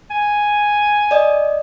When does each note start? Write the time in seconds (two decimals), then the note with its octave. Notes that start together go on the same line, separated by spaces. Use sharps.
0.10 G#5
1.11 D5 D#5